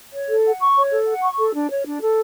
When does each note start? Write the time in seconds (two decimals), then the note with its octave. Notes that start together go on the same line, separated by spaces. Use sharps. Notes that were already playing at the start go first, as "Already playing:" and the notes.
0.13 C#5
0.29 A4
0.45 F#5
0.60 C#6
0.75 C#5
0.92 A4
1.07 F#5
1.23 C#6
1.38 A4
1.54 D4
1.69 C#5
1.85 D4
2.01 A4